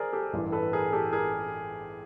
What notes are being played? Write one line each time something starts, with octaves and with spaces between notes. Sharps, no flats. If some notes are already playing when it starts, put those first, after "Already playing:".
Already playing: G#4 A#4 C5 D5
G4 A4
A1 G2 E3
A4 B4
G#4 A#4
G4 A4
G#4 A#4